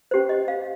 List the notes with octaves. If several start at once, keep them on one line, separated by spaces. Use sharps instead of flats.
C#4 G4 C5
D#5
F5